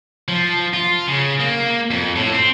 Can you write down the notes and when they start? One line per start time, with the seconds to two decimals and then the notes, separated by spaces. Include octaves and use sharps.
0.28 F3
0.74 F4
1.08 C#3
1.40 A#3
1.91 F2
2.16 A2
2.32 C4